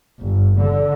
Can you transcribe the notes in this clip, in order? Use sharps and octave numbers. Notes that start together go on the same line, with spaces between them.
G1
D3